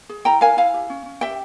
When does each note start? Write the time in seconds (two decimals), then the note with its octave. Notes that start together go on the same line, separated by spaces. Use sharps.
0.09 G#4
0.25 E4 G5 A#5
0.41 A#4 F5 G#5
0.57 E4 F5 G#5
0.74 G4
0.90 C#4
1.06 C#4
1.21 G4 E5 G5